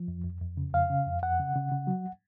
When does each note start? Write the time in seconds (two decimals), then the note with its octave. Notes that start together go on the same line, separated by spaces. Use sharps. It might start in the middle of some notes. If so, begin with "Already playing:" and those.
Already playing: F3
0.08 F2
0.25 F2
0.41 F2
0.57 C#3
0.73 F2 F5
0.90 C#3
1.06 F2
1.23 F2 F#5
1.39 C#3
1.56 C#3
1.72 C#3
1.87 F#3